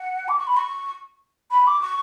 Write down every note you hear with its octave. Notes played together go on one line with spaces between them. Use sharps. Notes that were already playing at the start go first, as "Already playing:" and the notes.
Already playing: F#5
D6
C#6
B5
C#6
B5
D6
C#6